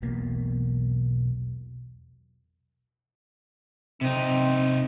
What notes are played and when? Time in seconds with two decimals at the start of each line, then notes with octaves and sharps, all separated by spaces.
0.02 E1 B1 B2 A#3
4.01 C3 C4 D#4